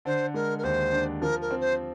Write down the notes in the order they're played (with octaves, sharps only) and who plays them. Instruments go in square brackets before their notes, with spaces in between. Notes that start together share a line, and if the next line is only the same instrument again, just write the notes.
[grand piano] D3 [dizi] C5
[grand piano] G#3 [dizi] A#4
[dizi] A#4
[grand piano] D#2 [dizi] C5
[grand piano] D4
[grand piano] F3 [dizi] A#4
[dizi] A#4
[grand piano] C4
[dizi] C5